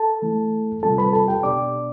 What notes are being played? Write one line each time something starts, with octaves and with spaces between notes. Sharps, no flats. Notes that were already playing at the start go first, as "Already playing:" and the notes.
Already playing: A4 A5
E3 A3 E4
C3 G3 C4 F4 A4 A5
B4 B5
A4 A5
G4 G5
B2 B3 D4 D5 D6